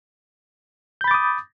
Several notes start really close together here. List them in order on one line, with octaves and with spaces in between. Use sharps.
G6 B5 A6 D6 D#6